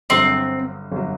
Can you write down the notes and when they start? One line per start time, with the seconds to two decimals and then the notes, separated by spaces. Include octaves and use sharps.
0.10 G1 G2 F#3 C4
0.92 G1 F#3